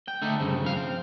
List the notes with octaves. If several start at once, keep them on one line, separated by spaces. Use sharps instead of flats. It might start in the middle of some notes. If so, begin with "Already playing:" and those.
G5
D3 A3 D#4
G2 C#3 C4
F2 F5
C4